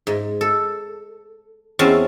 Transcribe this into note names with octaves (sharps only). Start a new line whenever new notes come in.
G#2
A4
E2 C4 C#4 A5